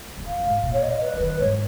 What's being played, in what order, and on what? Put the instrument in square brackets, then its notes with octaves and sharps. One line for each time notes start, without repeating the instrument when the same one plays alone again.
[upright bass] F#2
[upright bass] F2 [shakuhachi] F5
[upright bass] G#2
A#2
[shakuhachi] C#5
D#5
B4
[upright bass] F3
[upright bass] D#3 [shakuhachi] B4
[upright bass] G#2 [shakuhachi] C#5